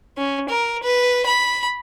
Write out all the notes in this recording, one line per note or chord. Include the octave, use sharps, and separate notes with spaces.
C#4
A#4
B4
B5